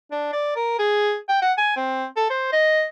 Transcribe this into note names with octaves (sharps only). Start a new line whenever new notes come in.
D4
D5
A#4
G#4
G5
F#5
G#5
C4
A4
C5
D#5